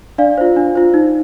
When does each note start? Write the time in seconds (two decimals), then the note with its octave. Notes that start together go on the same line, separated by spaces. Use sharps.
0.18 D4 D5 F5
0.38 F4 C5
0.56 D4
0.75 F4 C5
0.94 D#4